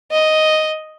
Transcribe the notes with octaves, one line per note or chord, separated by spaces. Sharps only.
D#5